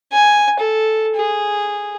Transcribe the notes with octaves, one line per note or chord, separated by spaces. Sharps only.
G#5
A4
G#4